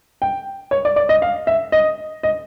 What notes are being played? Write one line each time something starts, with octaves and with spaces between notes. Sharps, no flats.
G5
C#5
D5
D5
D#5
F5
E5
D#5
D#5